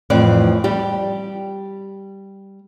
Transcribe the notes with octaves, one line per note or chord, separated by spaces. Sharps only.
F2 A2 E3 D5
G3 G4